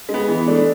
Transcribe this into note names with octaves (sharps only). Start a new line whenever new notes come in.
G#3
B3
E3
A3 D4